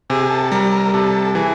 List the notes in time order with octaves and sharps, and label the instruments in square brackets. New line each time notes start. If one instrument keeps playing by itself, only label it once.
[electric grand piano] C3 [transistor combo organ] G#4
[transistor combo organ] A4
[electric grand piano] G3 [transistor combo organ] A#4
[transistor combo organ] A#4
[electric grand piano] C3 [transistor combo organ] A4
[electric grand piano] E3 [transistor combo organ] G#4